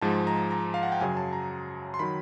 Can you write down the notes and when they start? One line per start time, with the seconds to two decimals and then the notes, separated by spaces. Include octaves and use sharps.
0.02 G#2 F3 G#3 A5
0.27 A#5
0.51 A#5
0.74 F5
0.83 F#5
0.92 G5
1.00 F#2 C#3 F#3 G#5
1.17 A5
1.33 A#5
1.94 C6
1.99 D#3 F#3 B5